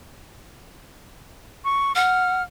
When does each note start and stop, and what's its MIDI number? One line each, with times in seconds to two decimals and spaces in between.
1.65 1.92 85
1.95 2.42 78
1.95 2.43 89